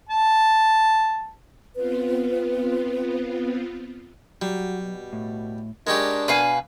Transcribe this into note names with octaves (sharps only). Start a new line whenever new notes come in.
A5
B3 C4 F4 B4
F#3 G3 F#4
B2
A2
G#3 C#4 D4 G4 A#4
B2 B4 F5 G#5